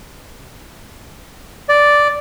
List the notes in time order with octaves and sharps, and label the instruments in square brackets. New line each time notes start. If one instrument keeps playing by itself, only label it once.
[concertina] D5